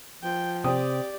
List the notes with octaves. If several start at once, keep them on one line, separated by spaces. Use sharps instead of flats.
F3 G5
C3 C4 G4 D5 G5 D#6